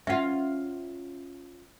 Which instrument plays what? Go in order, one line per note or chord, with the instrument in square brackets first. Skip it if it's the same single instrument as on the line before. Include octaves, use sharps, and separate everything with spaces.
[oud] C#4 F4 [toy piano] E5 F#5